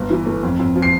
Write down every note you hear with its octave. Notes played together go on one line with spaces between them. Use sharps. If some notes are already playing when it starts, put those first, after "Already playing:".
Already playing: G1
E3
A3
F2
F2
F3
C7